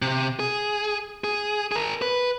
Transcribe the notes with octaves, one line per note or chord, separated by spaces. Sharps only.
C3
G#4
G#4
G#4 A#4
B4